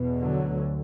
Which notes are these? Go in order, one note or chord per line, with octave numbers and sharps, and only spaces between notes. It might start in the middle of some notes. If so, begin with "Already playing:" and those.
Already playing: E2 B2
D3 F#3
D2